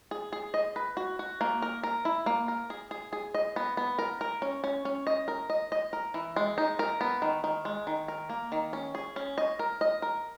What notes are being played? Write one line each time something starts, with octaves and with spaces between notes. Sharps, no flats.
G#4
G#4
D#5
B4
F#4
F#4
A#3
A#4
A#4
E4
A#3
A#4
G#4
G#4
G#4
D#5
B3
B3
A#4
A#4
C#4
C#4
C#4
D#5
A#4
D#5
D#5
A#4
E3
G#3
D#4
A#4
B3
D#3
D#3
G#3
D#3
A#4
A#3
D#3
C#4
G#4
C#4
D#5
A#4
D#5
A#4